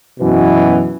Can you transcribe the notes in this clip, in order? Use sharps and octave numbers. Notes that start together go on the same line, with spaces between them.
F#2 B2 E3 B3